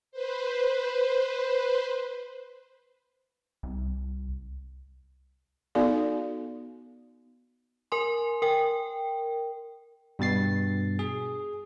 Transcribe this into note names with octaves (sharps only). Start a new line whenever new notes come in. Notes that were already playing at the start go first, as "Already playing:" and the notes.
B4 C5
C2
B3 D#4 F#4 A4 D5 F5
A#4 G#5 C6
A#4 G5
G2 B2 A6 C7
G#4